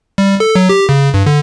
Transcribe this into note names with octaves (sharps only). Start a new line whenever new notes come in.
G3
A4
F#3
G4
C#3
G2
D3